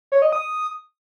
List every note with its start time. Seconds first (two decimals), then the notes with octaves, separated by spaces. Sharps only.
0.12 C#5
0.22 D#5
0.32 D#6